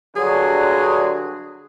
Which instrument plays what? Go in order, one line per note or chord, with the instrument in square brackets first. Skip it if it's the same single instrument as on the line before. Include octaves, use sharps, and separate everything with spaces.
[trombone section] G2 D3 F#3 [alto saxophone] G#4